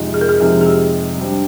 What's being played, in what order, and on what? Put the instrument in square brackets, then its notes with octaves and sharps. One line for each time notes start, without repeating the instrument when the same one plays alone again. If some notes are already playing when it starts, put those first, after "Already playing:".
Already playing: [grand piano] F2 C3 F3 G#3 D#4
[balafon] G#4
A#4
G#4
[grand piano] F2 C3 F3 G#3 D#4 [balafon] G#4
[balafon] G#4
G4
[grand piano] G3 D4 G4 C5